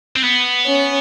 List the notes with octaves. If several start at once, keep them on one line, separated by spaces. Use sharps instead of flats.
C4
B3
C#4